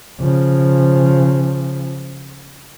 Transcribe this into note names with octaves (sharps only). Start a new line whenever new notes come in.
C#3 F3